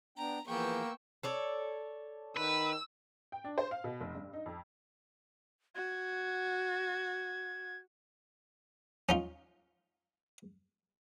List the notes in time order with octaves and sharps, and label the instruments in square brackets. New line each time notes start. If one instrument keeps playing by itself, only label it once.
[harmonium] B3 D4 G5 [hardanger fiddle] A#5
[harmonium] E3 F3 G#4 [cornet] A#3 [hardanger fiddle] B3 C#6 [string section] G5 E6
[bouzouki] A4 C#5 D5
[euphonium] D#3 [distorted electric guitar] B4 [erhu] E6
[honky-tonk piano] G5
D4
C5
F5
B2
F1
G2
D#4
F2
[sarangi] F#4 [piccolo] G#6
[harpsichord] C#4 D#4 F4